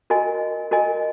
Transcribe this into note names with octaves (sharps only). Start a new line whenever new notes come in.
F#4 A#4 D#5 G#5
F#4 A#4 D#5 G#5